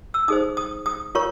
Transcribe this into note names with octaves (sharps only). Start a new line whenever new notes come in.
E6
D#4 G#4 C5 D#6
D#6
D#6
F4 A#4 C#5 C#6